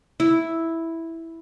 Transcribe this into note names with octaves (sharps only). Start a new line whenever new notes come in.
E4